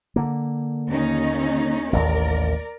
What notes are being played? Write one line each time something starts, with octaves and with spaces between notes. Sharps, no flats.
D3 A#3
D#2 C#4 D#4
A1 D#2 A#4 D5